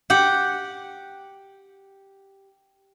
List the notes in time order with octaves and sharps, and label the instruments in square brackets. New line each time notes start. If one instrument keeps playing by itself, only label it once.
[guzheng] G4 F#5